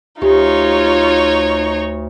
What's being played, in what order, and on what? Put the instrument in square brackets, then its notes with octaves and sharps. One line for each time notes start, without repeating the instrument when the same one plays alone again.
[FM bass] D2 [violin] D#4 C#5 [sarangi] F4 [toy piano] G4